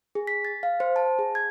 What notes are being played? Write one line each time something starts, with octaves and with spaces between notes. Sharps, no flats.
G#4
B6
A6
F5
C5
A5
G#4
G#6